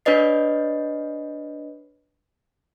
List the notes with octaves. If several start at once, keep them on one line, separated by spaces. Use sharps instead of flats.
D4 B4 C#5 D#5 C7